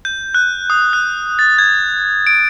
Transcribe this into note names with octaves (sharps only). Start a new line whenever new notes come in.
G6
F#6
D#6
F#6
A6
G#6
D7